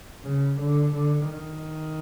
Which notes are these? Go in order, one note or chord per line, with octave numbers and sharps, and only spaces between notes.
C#3
D3
D3
D#3